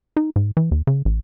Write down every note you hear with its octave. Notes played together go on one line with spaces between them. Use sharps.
D#4
G#2
E3
D#2
C#3
A1